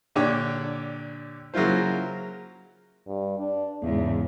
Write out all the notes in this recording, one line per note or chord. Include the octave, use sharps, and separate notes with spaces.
A#2 D3 D4 G4 C#5
C#3 F#3 A#3 E4 F4 C5
G2
D4
E2 G#2 C#3